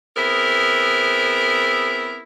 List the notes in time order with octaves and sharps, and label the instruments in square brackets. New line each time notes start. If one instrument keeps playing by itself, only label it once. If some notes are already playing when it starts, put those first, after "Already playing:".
[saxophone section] B3 C4 E4 G#4 A#4